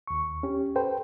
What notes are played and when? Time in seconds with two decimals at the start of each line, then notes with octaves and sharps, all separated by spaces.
0.07 D#2 C#6
0.43 C#4 G4
0.76 A4 B4 C5 G5